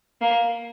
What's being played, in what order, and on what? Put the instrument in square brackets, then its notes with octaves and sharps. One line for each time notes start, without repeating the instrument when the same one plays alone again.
[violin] A#3